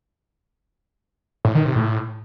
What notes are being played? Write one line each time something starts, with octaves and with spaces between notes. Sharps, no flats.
A2
D#3
C3
A2